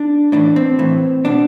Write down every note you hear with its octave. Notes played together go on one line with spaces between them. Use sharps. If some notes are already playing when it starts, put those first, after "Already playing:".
Already playing: D4
A2 E3 D4
C4
A2 E3
B2 D4